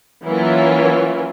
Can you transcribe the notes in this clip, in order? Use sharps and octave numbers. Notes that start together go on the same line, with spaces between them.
E3 F#3 A#3 C#4 E4 F4